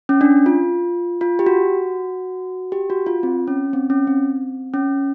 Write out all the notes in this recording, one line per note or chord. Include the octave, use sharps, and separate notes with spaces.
C#4
D4
F4
F4
G4
F#4
G4
F#4
F4
C4
C#4
C4
C#4
C4
C#4